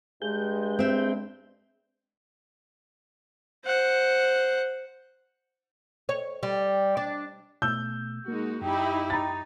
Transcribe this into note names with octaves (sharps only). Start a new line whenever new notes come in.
G2 G#3 G#4 G6
C4 E5
C5 F#5
C#5
G3
D4
B2 A3 E6 G6
G#3 A#3 D#4 F#4
F#2 D#4 E4 G4 G5
D#4 A#5 A6